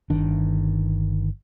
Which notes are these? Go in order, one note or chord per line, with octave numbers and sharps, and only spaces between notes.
G1 D#3 D4